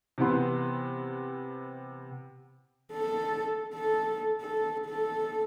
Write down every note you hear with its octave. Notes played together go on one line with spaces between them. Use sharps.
C3 E3 B3 C6
A4
A4
A4
A4